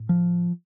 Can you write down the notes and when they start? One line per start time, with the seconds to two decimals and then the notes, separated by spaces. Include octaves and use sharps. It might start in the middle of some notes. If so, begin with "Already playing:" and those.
Already playing: A2
0.09 F3